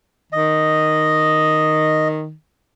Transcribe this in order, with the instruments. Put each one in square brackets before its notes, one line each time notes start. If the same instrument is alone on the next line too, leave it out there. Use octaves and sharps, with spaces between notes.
[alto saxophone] D#3 [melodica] D#5